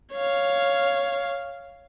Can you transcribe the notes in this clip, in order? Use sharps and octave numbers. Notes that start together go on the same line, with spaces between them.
C#5 F5